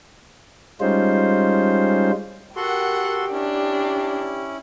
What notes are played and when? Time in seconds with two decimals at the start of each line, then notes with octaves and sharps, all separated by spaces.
0.81 G3 G#3 C#4 D#4 F4 C5
2.56 F#4 G4 A4 A#4 F#5 C6
3.32 C#4 D4 E4